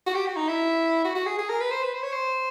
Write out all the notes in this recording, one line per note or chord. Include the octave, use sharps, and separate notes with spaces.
F#4
G4
F#4
D#4
E4
F#4
F#4
G#4
G#4
A#4
B4
C5
B4
C5
C#5
C5